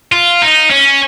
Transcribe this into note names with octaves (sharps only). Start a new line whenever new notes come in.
F4
D#4
C#4